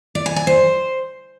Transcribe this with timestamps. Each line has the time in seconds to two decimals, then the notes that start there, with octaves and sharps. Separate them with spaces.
0.15 D5
0.26 G#5
0.36 G#5
0.47 C5